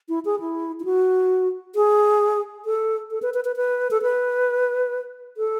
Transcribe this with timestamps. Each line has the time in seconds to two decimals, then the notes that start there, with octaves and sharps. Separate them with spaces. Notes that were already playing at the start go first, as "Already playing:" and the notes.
0.09 E4
0.25 G#4
0.40 E4
0.80 E4
0.85 F#4
1.75 G#4
2.65 A4
3.11 A4
3.22 B4
3.34 B4
3.45 B4
3.56 B4
3.91 A4
4.02 B4
5.37 A4